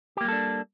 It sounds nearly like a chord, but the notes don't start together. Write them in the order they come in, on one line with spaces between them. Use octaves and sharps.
G4 A#3 G3 A4 D4